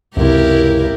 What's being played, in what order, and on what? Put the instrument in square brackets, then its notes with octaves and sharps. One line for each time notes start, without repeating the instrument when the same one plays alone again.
[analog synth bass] C#2 [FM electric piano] F#2 C3 [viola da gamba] E4 G4 A#4